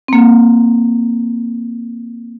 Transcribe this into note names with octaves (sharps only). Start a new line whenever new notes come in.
A#3 C4